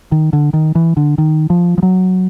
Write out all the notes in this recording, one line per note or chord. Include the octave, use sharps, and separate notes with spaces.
D#3
D3
D#3
E3
D3
D#3
F3
F3
F#3